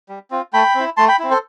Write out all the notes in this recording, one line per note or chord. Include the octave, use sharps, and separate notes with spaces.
G3
C4 F4
A3 G5 B5
C4 E4
A3 A5 C6
G5 B5
C4 E4
A4 C5